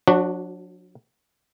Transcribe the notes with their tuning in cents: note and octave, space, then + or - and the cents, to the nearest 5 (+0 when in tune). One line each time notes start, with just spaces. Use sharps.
F#3 -45 D4 +0 F#4 +0